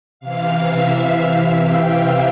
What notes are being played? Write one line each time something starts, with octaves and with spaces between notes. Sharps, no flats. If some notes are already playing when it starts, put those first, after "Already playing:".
C3 E3 F5
E5
F5
G5